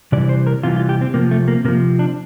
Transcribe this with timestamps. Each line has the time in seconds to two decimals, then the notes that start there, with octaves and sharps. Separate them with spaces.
0.12 C3 E3 G3 D5
0.29 C5
0.47 A#4
0.63 C3 E3 G3 F4
0.76 F4
0.89 G4
1.01 C4
1.14 C3 F3 A#3
1.31 A3
1.48 A#3
1.65 C3 A#3
1.68 F3
1.99 D4